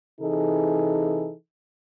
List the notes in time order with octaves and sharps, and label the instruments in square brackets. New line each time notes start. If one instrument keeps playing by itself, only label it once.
[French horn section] C3 E3 D#4 G#4 A4